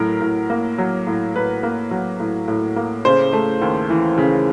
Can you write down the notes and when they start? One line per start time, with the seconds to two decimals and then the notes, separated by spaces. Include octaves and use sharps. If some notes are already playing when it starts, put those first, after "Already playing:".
Already playing: A2 F#3 A#4
0.21 A2
0.50 A#3
0.78 F#3
1.07 A2
1.34 A2 B4
1.63 A#3
1.91 F#3
2.20 A2
2.48 A2
2.76 A#3
3.05 C#3 C5
3.33 A3
3.61 D#2
3.90 E3
4.18 C#3